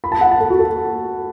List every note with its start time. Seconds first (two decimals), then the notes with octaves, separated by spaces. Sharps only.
0.04 B5
0.12 A5
0.21 F#5
0.31 A5
0.40 A4
0.50 F#4
0.59 A4